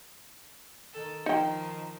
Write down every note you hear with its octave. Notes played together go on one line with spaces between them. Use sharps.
D#3 A4
D#3 F3 D#4 G5